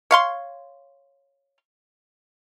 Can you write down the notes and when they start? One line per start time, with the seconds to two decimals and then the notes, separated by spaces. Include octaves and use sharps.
0.11 C#5 F5 C6